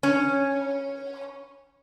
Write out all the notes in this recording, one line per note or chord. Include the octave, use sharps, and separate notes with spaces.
C#4